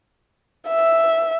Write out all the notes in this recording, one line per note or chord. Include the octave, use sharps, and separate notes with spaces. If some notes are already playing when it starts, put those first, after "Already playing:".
E5